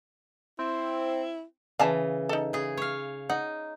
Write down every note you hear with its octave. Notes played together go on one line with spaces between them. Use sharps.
C4 E4
C#3 E3 F5 G#5 A5
D#4 A4
C#3 G#4
C#5 F5
D#4 F#5